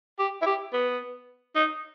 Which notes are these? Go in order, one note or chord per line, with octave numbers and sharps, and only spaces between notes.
G4
E4
G4
B3
D#4